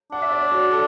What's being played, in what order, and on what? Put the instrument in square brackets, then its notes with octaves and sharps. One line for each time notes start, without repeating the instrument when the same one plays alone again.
[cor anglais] D4 [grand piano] F#5
[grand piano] E5
D5
C#5
F#4
A4